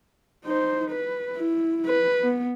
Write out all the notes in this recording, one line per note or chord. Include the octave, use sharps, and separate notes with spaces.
D#4 C5
B4
E4
B4
B3